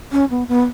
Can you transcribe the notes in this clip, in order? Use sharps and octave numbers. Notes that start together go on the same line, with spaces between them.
C#4
B3
B3